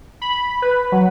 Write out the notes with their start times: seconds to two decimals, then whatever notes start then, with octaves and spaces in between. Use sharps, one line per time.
0.22 B5
0.62 B4
0.92 F#3